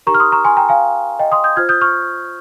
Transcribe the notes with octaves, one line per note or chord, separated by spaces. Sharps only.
D#4 G4 A#4 A#5 C#6
F6
C6 D#6
A#5 C#6
G#5 C6
G5 A#5
F5 G#5
D#5 G5
C6 D#6
D#6 G6
F4 C5 F6 G#6
D#6 G6
C#6 F6